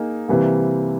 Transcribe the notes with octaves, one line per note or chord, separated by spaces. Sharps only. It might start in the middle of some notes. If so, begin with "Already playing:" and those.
Already playing: A#3 D#4 G#4
C3 E3 G3 A#3